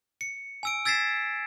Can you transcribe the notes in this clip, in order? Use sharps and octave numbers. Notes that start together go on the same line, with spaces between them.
C#7
G#5 E6 D7
E6 G#6 A6 B6 C7 E7